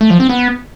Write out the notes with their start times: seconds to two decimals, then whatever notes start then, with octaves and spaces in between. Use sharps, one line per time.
0.01 A3
0.10 F3
0.20 C4
0.29 B3